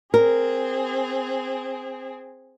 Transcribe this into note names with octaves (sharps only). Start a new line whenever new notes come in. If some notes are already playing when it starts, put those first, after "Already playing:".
C4 G#4 A#4